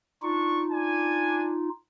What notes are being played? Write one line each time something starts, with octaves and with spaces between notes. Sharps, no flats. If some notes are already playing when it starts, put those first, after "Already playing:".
D4 D#4 F4 C#6
D4 G#5